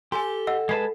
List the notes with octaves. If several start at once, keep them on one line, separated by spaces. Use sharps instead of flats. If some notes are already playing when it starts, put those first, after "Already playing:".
G4 A4 G#5 C6
D#5 F#5 E6
G#3 B4 A5 C7